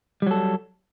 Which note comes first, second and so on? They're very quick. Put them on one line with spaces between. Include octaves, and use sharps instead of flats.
G3 F#3 A4